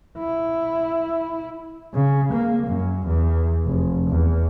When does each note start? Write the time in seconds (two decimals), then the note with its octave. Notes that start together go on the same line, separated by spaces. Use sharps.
0.18 E4
1.94 C#3
2.32 A#3
2.67 F#2
3.06 E2
3.65 F1
4.10 E2